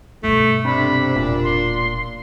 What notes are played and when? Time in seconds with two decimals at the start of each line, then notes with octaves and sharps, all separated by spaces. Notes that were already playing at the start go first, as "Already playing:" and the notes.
0.23 G2 B2 A3
0.65 C3 D4 B5
1.16 E1 A#2
1.44 C6